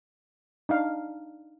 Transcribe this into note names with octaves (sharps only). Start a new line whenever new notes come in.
D4 D#4 F5